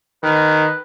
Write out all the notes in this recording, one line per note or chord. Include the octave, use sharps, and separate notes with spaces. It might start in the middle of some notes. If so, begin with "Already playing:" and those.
D#3 B4